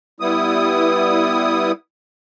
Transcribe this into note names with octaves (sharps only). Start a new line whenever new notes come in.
G3 B3 E4 D#6